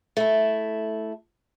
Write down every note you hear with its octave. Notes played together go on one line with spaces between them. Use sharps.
A3 E4